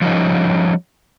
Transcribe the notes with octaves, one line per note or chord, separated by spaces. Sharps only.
F3 G3 C#4 D#4 D#5